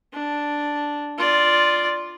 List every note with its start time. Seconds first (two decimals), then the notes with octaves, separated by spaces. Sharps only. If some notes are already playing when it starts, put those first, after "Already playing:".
0.13 D4
1.18 F4 D5